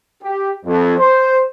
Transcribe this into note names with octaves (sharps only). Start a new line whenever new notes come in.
G4
F2
C5